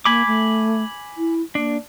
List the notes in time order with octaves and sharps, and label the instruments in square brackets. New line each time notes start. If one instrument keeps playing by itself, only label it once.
[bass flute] A#3 [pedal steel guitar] G#5 B5 D6
[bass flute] A3
E4
[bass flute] A#3 [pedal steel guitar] D4